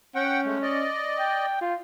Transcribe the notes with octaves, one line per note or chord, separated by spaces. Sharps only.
C#4 F#5 G5
G#3 A3
D5 D#5
G5
F4